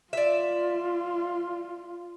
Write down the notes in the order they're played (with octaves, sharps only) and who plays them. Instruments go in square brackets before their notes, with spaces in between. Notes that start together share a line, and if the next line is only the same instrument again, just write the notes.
[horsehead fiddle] F4 [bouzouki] D5 E5